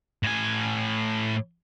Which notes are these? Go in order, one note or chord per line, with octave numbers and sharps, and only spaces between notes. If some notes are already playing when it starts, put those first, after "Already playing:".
A2 G#5